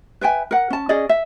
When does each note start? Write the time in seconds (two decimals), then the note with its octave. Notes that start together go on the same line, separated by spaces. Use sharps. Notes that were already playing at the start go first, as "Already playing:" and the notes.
0.21 B4 E5 G5 G#5
0.51 A#4 F#5
0.70 C#4 A5
0.89 C#4 G#4 D5 D#5
1.09 E5